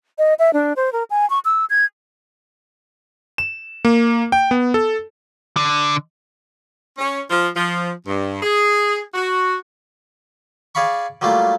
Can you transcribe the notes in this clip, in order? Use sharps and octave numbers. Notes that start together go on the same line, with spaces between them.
D#5
E5
D4
C5
A#4
G#5
C#6
E6
G#6
E7
A#3
G5
B3
A4
D3
C#4
F3
F3
G2
G#4
F#4
G#4 D5 F5 B5 C#6
F#3 G3 A3 A#3 F4